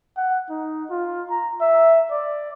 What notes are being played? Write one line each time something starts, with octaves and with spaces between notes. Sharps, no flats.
F#5
D#4
F4
A#5
E5
D5